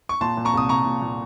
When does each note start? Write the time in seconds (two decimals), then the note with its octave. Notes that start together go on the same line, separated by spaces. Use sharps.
0.09 C#6
0.21 A#2 A5 C6
0.37 A#2
0.45 A#5 C#6
0.54 C2 D#6
0.69 C2 A#5 C#6
0.86 A#2
1.01 A#2